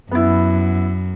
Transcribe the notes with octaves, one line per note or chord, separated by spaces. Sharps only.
F#2 B3 E4